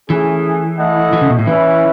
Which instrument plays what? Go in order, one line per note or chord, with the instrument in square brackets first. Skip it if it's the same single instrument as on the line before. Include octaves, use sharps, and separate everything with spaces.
[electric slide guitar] E3 [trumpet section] A3 C#4 G#4
[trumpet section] A3 E4 A4 D#5 F#5
[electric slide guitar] E3
C#3
B2
A2
[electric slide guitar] E3 [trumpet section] C#4 E4 B4 E5